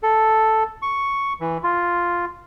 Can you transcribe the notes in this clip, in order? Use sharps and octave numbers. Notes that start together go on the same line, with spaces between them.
A4
C#6
E3
F4